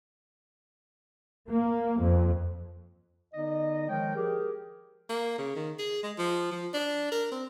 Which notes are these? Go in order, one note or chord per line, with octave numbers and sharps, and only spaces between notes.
A#3
F2
D3 B3 D#4 D5 D#5
D#3 F3 G#3 A#4 C#5 G5
F3 G4 G#4 A#4
A#3
C#3
D#3
G#4
G#3
F3
F3
D4
A#4
C4